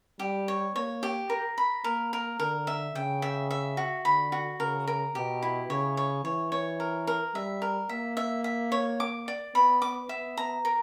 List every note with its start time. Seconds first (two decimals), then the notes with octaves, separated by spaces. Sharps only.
0.19 G3 G4
0.48 C#5
0.75 A#3 C#5
1.03 G4
1.30 A#4
1.58 B5
1.84 A#3 A#4
2.13 A#4
2.39 D3 A#4
2.67 E5
2.95 C#3 G5
3.22 E5
3.51 E5
3.77 F#4
4.05 D3 B5
4.32 F#4
4.60 C#3 A#4
4.87 A#4
5.15 B2 G4
5.42 E4
5.70 C#3 C#5
5.97 C#5
6.24 E3 C#5
6.52 C#5
6.80 A#4
7.07 A#4
7.34 G3 E5
7.62 A#4
7.89 A#3 E5
8.17 E5
8.44 E5
8.72 C#5
9.00 D6
9.28 D5
9.55 B3 B5
9.82 D6
10.09 B3 E5
10.37 A#5
10.65 A#4